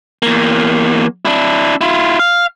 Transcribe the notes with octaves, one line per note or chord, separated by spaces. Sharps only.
E2 A#3
D4 E4
E4 F4
F5